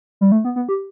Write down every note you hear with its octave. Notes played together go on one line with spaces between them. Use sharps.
G3
A3
B3
B3
G4